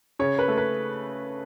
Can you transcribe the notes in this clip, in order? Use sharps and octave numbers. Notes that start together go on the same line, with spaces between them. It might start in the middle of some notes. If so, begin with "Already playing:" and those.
C#3 C#5
B4
A3
B4